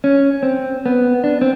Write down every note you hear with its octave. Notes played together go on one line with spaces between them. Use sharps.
C#4
C4
B3
D4
C4